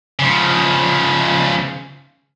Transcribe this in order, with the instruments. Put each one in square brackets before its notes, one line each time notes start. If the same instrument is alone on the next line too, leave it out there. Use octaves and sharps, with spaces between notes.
[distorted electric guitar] C#3 F3